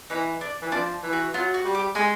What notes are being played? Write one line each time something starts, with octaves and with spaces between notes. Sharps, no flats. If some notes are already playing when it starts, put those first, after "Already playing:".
E3 D#4
D4
E3
F3 D4
E3
F#4
F#3 F4
F#4
G3
G4
G#3 G#4